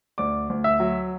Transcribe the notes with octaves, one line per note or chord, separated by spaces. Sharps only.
D2 D5 D6
D2
E5 E6
F#3